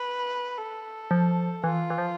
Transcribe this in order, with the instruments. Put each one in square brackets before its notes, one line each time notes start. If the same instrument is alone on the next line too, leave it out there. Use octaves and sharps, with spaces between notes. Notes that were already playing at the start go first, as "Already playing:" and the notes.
Already playing: [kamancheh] B4
A4
[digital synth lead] F3
[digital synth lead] E3 [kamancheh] F4
[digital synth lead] E3
F3